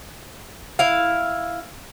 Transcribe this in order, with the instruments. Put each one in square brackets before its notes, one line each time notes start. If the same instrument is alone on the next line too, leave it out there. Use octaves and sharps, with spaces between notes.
[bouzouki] E4 F5